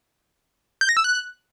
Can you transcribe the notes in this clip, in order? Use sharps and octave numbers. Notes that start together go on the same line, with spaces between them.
G6
A#6
E6
F#6